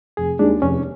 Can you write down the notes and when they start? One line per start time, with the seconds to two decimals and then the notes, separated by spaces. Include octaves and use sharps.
0.17 F1 G#4
0.39 D#2 D#3 G#3 D4
0.62 F1 C#4